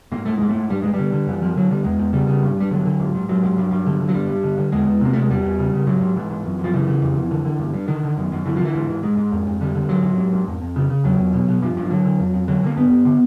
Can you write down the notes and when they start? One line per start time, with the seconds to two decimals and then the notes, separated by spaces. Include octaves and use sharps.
0.12 G#2 A#3
0.25 G#2 A3
0.37 G#2 G#3
0.49 A3
0.55 G#2
0.70 G2 G3
0.82 G2 G#3
0.93 G3
0.99 D3
1.12 D3
1.27 F#2 E3
1.42 F#2 F3
1.56 D3 F#3
1.70 D3 G3
1.84 E2 G#3
1.99 E2
2.13 C#3 G3
2.27 C#3
2.43 G2
2.57 G2 G3
2.71 D3 F#3
2.85 D3
3.00 G#2
3.15 G#2
3.29 G#2 F#3
3.43 G#2
3.58 G2
3.71 G2
3.86 D3
4.00 D3
4.09 F#3
4.14 G2 G3
4.29 G2
4.43 D3
4.58 D3
4.72 E2 G#3
4.86 E2
5.01 C3 A#3
5.13 C3 A3
5.22 G#3
5.30 E2 G3
5.44 E2
5.59 C#3
5.73 C#3
5.87 G#2 F#3
6.01 G#2
6.16 G#2 E3
6.31 G#2
6.45 F#2
6.59 F#2 F3
6.73 C#3 E3
6.88 C#3
7.02 F2
7.16 F2
7.31 D3
7.45 D3
7.59 G2
7.74 G2
7.88 D3 D#3
8.03 D3
8.17 F#2
8.32 F#2
8.46 D3 E3
8.56 F3
8.60 D3 E3
8.75 G#2
8.89 G#2
9.03 G#2 G#3
9.17 G#2
9.32 F2
9.47 F2
9.61 D3 G3
9.75 D3
9.89 G#2 F#3
10.04 G#2
10.18 G#2
10.33 G#2
10.48 F2
10.62 F2
10.76 C#3
10.90 C#3
11.04 E2 F#3
11.18 E2
11.33 B2
11.48 B2
11.62 G2 F3
11.77 G2
11.85 F3
11.90 D3 F#3
12.05 D3
12.20 F2
12.34 F2
12.48 D3 F#3
12.63 D3 A#3
12.76 G2 B3
12.91 G2
13.05 D3